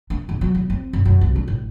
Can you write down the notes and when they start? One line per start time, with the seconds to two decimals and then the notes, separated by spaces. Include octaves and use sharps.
0.10 D4
0.29 E2
0.41 F#3
0.55 E2
0.70 C4
0.93 F#2
1.05 F#2
1.21 C2
1.36 D4
1.48 A1